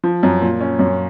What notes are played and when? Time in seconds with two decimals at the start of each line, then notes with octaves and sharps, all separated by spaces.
0.04 F3
0.23 F#2
0.41 A#2
0.61 C#4
0.79 F#2